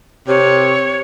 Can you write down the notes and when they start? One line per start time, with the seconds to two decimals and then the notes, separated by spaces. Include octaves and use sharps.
0.28 C3 C#5